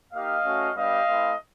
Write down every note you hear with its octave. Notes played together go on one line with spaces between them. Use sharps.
A#3 D#4 G4 D#5 F5
A3 C#4 F#4
G3 B3 D4 G4 D#5 F5
A3 C4 E4